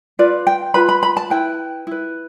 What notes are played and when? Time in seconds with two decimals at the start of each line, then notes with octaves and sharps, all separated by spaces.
0.19 F4 B4 D5
0.47 G5
0.74 F4 B4 B5
0.89 B5
1.03 B5
1.17 A5
1.30 E4 B4 G5
1.87 E4 B4